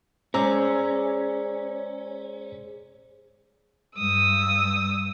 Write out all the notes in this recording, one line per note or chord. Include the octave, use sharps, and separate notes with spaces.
G#3 C#4 G#4 C5 D5 A#5 E6
G2 D#6 E6